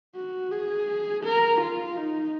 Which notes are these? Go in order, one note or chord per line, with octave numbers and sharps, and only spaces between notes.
F#4
G#4
A#4
F4
D#4